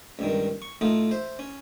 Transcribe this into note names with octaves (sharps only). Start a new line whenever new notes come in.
C#2 G2 D#3
C#6
A2 A3 D#4 F4
C5 E5
C#4